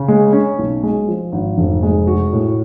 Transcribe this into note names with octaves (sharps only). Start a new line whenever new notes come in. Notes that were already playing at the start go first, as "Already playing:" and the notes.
Already playing: C#3
G#3
C#4
B1
G#3
F3
G#1
F1
G#3
F#4
A2